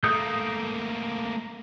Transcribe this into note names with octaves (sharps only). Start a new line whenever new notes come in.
A3 A#3 A4 D#6 G6